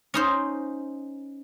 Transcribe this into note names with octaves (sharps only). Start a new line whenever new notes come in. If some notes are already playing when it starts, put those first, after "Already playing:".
C#4 D#4 C5